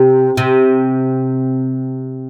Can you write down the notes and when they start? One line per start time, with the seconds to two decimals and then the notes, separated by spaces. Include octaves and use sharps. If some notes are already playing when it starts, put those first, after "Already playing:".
Already playing: C3
0.37 C3